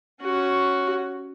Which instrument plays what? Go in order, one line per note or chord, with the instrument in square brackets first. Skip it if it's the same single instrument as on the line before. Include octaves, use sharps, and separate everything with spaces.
[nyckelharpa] C#4 F#4